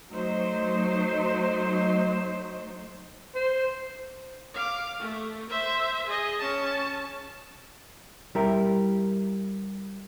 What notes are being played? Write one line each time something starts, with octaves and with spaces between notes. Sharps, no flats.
F#3 A3 D#4 C5
C5
F5 D6
A3
C5 E5
G#4 D#5
C#4 A5
G3 E4 G4 A#4